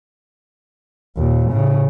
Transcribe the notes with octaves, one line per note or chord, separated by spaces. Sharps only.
D#2 A#2
A2 C#3